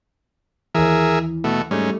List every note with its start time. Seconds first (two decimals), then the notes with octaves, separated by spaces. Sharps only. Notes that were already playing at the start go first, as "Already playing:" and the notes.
0.75 D#2 E3 G#4 A#4 E5
1.44 B2 A3
1.71 G#2 G3 A3 C#4